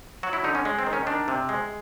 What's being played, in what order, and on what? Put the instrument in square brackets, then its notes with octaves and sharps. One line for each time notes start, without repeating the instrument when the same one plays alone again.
[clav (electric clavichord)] F#3 F#4
E4
D3 D#4
C#4
G#3
C4
D#3
C#4
D#3 D4
C3
G#3